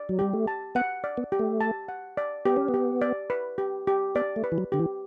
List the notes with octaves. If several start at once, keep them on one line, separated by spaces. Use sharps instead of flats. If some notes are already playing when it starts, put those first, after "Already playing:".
Already playing: D5
F#3
G3 G4
A3
A5
B3 F#5
D5
B3
G4
A3
A5
F#5
D5
B3 G4
C#4
B3
G4
D5
B4
G4
G4
B3 D5
A3
B4
E3
F#3
D3 G4
E3